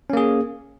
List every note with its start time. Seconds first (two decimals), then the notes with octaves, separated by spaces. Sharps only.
0.10 C#4
0.13 A#3
0.17 G#4